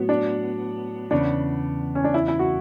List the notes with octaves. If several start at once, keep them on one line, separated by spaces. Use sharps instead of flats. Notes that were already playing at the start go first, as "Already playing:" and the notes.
Already playing: A2 F#3 B3
D4
E2 C#3 B3 D4
C#4
D4
E4
E4
F#4